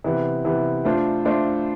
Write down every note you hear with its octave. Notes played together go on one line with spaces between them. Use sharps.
C3 E3 B3
C3 E3 B3
A3 D4 F4 C5
A3 D4 F4 C5